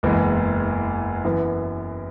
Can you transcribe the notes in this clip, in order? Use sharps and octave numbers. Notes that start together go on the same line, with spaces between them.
F#1 E2 E3 G#3
F#2 E3 B3